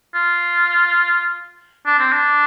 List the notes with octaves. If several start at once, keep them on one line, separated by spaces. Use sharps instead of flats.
F4
D4
C4
D4